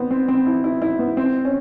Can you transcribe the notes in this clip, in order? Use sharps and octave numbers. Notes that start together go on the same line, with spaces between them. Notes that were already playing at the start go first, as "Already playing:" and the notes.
Already playing: B3 C4
C4
C4
E4
E4
E4
B3
C4
C#4